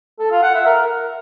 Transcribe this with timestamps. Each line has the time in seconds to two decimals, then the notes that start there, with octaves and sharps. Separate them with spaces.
0.19 A4
0.31 F4
0.43 F#5
0.54 E5
0.66 A#4